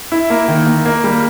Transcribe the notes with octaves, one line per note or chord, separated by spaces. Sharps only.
E4
A#3
D#3
A#3
A#3
G3